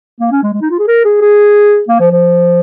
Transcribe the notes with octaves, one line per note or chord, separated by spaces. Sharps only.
A#3
C#4
G#3
G#3
D#4
F4
G#4
A#4
G#4
G#4
A#3
F3
F3